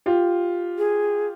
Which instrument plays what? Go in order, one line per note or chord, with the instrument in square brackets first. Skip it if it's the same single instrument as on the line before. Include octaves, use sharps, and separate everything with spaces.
[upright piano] F4 G4
[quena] G#4